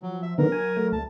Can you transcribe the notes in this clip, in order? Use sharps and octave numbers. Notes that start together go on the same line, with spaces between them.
F3 F#3
E5
D3 D#3 F#3 B3 A#4
G#5
A3
D2 A5